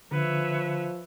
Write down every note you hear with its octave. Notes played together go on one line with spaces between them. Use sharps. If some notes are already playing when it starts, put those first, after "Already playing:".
D3 F3 B4 C#5 E5